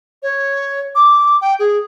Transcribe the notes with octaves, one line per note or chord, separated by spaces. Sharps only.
C#5
D6
G5
G#4